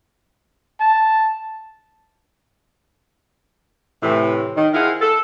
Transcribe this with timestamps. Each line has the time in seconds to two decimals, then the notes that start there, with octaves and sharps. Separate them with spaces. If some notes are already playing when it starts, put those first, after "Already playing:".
0.80 A5
4.03 A2 C3 E3
4.56 D#3
4.74 E4 G#4 A#4 C5 F5 F#5
5.01 A4